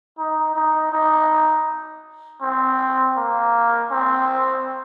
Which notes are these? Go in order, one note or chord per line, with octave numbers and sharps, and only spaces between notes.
D#4
D#4
D#4
C4
A#3
C4